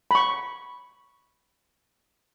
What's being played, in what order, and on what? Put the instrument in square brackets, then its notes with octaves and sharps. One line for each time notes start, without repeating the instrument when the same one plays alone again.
[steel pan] B5 C#6